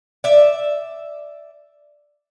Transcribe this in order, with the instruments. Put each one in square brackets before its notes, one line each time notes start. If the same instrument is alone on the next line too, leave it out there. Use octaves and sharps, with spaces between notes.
[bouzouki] D5 E5